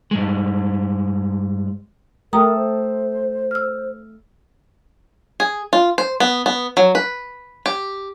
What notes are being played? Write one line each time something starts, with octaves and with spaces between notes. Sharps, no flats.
G2 G#3
A3 A4 A#4 G5 A#5 D#6
C5
E6 F6
G#4
F4
C5
B3
B3
F#3
B4
G4